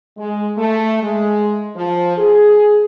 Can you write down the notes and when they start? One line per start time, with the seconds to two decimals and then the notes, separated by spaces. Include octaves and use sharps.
0.18 G#3
0.57 A3
1.03 G#3
1.76 F3
2.18 G#4